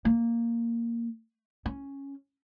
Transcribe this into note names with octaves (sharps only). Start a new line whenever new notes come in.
A#3
C#4